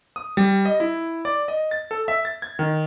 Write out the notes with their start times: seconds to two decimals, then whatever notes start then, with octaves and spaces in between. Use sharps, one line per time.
0.16 D#6
0.37 G3
0.65 D#5
0.80 E4
1.25 D5
1.48 D#5
1.71 A6
1.91 A4
2.08 E5
2.25 A6
2.42 G#6
2.59 D#3